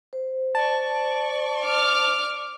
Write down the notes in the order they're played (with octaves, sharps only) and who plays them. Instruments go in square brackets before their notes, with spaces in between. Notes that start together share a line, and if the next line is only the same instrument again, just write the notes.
[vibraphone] C5
[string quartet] D5 C#6 [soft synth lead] A5
[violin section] D6 F6